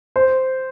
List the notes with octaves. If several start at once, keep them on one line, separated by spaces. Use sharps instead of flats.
C5